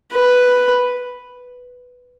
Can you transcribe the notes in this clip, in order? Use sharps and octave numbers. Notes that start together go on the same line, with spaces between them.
B4